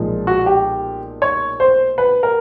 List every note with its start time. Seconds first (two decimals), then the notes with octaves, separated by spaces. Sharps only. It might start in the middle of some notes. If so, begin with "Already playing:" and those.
Already playing: B1 A#2 F3 G#3
0.27 F#4
0.46 G4
1.22 C#5
1.60 C5
1.98 B4
2.23 A#4